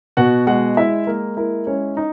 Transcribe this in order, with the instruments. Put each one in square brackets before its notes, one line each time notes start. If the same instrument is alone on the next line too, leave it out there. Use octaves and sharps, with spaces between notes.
[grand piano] B2 F#4 F#5
G#3 F#4 F#5
G#3 E4 E5
G#3 A#3 A#4
A#3 E4 A#4
G#3 C#4 C#5
D#4